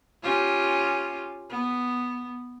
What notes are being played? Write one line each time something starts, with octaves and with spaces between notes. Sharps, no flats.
C#4 F4 G4
B3